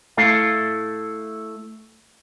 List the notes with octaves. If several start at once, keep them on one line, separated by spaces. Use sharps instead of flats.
A3 E4 A4 F5